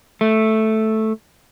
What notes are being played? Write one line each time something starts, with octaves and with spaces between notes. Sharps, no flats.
A3